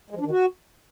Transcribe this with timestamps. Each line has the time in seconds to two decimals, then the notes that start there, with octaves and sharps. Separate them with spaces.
0.11 G#3
0.16 F3
0.21 D4
0.26 D#3
0.31 F#4